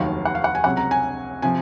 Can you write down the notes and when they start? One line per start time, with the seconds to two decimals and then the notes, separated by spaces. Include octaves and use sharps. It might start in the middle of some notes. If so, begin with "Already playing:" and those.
Already playing: F1 D#2 D#3 F#3 F5
0.25 F#5
0.35 F5
0.44 F#5
0.55 G#5
0.64 C#2 C3 F#3 F#5
0.77 A#5
0.91 G#5
1.42 C3 F3 G#5